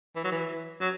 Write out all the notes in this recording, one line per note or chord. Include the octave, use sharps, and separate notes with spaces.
E3
F#3
E3
F#3